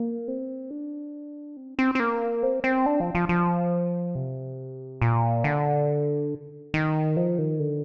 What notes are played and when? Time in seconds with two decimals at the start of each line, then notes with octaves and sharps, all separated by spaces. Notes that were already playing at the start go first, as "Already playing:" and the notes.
Already playing: A#3
0.28 C4
0.71 D4
1.57 C4
1.79 C4
1.95 C4
2.00 A#3
2.43 C4
2.64 C4
2.86 D4
3.00 F3
3.15 F3
3.29 F3
4.15 C3
5.02 A#2
5.44 D3
6.74 D#3
7.17 F3
7.38 D#3
7.59 D3